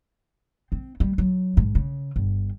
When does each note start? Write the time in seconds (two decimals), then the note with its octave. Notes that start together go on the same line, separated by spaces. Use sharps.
0.72 C4
1.00 G3
1.18 F#3
1.57 G#2
1.75 C#3
2.16 G1